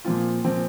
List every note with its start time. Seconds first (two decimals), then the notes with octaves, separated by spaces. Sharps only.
0.05 A#2 F3 C4 F4
0.44 A#2 F3 C4